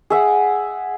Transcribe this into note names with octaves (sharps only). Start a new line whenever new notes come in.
G#4 E5 F#5